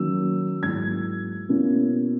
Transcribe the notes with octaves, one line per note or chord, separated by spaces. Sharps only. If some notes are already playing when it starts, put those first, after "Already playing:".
Already playing: D#3 F#3 A#3 C#4 E6
G#2 F#3 A#3 E4 G#6
B2 A#3 C#4 E4